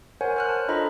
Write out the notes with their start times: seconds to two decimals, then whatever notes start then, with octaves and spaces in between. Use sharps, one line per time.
0.21 A#4 C5 C#5 F#5 G#5
0.36 C5 F6 F#6
0.49 A5
0.68 D4 F4 A4 D#5 A#5 B5